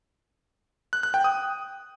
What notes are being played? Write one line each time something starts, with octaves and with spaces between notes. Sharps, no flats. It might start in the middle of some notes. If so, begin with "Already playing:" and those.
F#6
F#6
G5
D#6